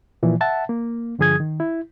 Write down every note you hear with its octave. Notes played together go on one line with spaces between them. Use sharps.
A#2 E3 F3
E5 F#5 A5
A#3
G2 D3 F3 G#4 D#6 G#6
D#3
E4